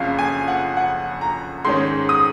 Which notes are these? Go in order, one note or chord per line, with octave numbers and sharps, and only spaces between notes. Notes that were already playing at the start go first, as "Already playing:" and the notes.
Already playing: F#1 F2 C#3 F5
G#5
F#5
F#5
A#5
G#2 D#3 G#3 C#4 C6
D#6